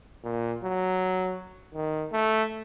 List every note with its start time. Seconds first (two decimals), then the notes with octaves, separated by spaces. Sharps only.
0.24 A#2
0.64 F#3
1.74 D#3
2.12 A3